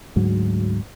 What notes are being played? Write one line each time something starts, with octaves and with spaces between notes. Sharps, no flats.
D2 G#2 F#3